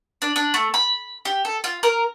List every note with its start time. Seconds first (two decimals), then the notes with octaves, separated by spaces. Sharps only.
0.22 D4
0.36 D4
0.54 A3
0.74 B5
1.25 G4
1.45 A4
1.64 F4
1.83 A#4